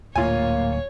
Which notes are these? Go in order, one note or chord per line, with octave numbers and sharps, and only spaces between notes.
D1 D2 A#2 A#3 F4 C#5 G#5